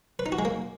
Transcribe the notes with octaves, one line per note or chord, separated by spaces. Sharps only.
B4
D#4
F#4
G#3
A#3